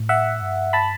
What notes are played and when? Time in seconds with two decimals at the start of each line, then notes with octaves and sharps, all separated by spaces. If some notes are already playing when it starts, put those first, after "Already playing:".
Already playing: A2
0.09 E5 F#5
0.41 G2
0.73 A5 B5